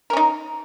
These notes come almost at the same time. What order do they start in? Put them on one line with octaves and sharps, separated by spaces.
A#4 C#4 D#4